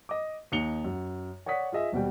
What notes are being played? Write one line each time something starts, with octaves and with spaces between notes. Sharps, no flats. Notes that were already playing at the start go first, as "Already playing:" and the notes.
D#5 D6
D#2 D#4 C#7 F7 G7
F#2
C#5 D5 F#5 D#6 B6
F4 G#4 D#5 E5
D#1 B2 G3 G5